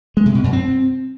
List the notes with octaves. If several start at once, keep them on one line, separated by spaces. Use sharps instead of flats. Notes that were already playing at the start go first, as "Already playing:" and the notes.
G#3
C3
B2
F#2
C4